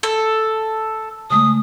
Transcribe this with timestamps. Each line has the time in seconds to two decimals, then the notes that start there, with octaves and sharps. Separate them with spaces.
0.03 A4
1.30 C#3 G#3 A3 D#6